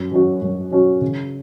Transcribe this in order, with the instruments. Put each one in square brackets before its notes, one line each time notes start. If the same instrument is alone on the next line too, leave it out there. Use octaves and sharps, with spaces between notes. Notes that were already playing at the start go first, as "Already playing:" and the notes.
Already playing: [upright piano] F#2
F#3 C#4 F#4
F#2
F#3 C#4 F#4
C#3